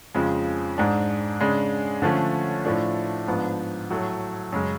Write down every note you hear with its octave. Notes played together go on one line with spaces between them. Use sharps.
F2 C#3 F3 G#3
G#2 G#3 D4
C#3 G#3 D4
D3 F3 A3 C#4
A2 F3 A3 D4
G#2 F3 B3 D4
A2 F#3 A3
F#2 C#3 G#3 C#4